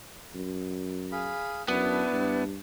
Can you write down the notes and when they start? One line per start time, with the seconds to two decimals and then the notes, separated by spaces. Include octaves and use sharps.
0.35 F#2
1.12 G#4 F5 B5
1.68 F#2 B3 D4 E4 A5
2.12 G2